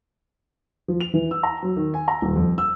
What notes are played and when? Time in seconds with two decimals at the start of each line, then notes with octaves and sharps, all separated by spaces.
0.88 F3
1.01 F7
1.14 E3
1.31 E6
1.43 A#5
1.63 F#3
1.76 D#3
1.94 G#5
2.08 A#5
2.22 D#1
2.36 F2
2.58 E6